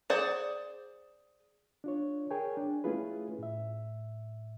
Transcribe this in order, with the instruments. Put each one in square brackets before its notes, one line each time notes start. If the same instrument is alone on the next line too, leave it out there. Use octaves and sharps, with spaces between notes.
[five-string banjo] G#4 C5 D5 F#5
[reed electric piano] D4 F4 C#5
G#4 A#4 C#5 G5 G#5
D4
A3 C#4 E4 F4 G#4 B4
A2 E5